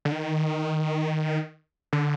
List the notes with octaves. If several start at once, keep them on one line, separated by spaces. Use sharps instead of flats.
D3
D#3
D3